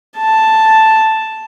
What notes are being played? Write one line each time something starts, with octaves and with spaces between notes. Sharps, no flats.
A5